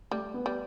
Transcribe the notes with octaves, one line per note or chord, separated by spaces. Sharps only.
G3 A3
B3
G3